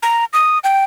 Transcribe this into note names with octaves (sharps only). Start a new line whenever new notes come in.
A#5
D#6
G5